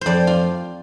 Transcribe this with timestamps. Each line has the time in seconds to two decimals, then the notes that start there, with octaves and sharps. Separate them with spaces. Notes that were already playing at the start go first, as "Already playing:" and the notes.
0.01 F2 C5 D5
0.27 F4